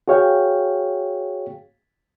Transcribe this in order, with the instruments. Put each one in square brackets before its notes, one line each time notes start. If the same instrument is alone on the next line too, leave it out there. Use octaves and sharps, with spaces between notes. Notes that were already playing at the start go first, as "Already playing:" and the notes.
[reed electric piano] F#4 G#4 C#5 F5 G5